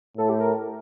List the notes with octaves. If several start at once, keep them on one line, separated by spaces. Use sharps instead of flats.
A2 A4
G4
A#4